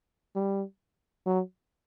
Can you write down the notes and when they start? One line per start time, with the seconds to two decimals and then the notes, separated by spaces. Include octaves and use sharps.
0.35 G3
1.26 F#3